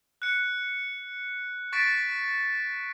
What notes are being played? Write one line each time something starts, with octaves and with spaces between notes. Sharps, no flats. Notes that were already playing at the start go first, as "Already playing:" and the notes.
F#6 C#7
C#6 A6 B6 D7